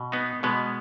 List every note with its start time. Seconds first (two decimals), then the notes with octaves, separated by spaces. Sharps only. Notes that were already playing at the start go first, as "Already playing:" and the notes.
Already playing: B2
0.12 B3 D#4
0.43 B2 G#3 B3